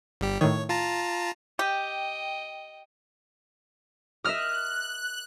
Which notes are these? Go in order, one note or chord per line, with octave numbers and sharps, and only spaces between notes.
G1 G3 G4
A2 D#3 C#5
F4 A5 A#5
G4 D#5 G5
A#4 D#5 E5 D#6 F6 F#6